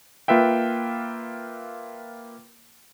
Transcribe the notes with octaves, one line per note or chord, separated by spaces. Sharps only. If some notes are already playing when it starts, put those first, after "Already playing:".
A#3 F4 B4 E5 G5